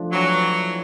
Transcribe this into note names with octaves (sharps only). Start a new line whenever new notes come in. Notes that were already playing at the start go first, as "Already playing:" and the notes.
Already playing: F3 A3 D4
E3 F#3